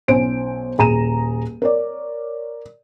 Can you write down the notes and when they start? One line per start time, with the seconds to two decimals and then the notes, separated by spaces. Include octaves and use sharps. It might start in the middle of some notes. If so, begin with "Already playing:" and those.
0.08 B1 C#4 C5 D7
0.78 D#1 G#4 A#5 D#7 E7
1.62 A#4 C#5 D5